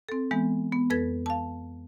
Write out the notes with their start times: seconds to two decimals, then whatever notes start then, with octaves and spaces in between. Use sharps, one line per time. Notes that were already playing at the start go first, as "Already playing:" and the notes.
0.09 C4 A4
0.31 E3 G#3 B3
0.73 B3
0.90 F2 A4 B4 G#6
1.26 F5 A5